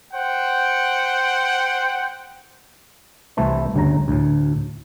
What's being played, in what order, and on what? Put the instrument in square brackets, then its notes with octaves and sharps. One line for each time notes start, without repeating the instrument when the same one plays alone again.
[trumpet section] C5 F#5 G5
[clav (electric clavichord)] C2 E3 A3 A4 C5
G1 D2 C#3 A#5
D2 A2